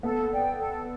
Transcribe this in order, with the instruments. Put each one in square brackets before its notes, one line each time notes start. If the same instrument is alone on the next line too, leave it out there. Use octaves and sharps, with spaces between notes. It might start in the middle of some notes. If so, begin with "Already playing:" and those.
[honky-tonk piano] B3 [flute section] A4
[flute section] D5 G5
A4